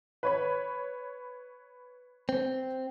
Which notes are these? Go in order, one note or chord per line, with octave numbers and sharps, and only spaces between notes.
B4 C#5 B5
C4